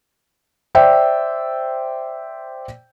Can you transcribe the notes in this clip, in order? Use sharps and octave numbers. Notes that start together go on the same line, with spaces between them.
C5 D5 E5 G5